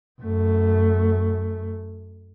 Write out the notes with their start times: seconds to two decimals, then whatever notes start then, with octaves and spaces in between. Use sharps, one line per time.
0.22 F#2 A3